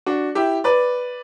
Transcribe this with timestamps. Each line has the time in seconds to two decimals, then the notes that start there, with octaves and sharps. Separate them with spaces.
0.06 D4 F#4
0.35 E4 G4
0.64 B4 D5